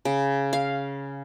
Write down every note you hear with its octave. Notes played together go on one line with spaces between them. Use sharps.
C#3
F5